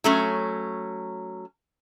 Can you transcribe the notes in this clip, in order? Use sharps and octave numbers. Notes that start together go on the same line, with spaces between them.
F#3 A3 C#4